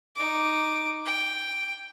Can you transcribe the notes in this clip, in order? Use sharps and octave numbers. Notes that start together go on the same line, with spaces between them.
D#4 D6
G5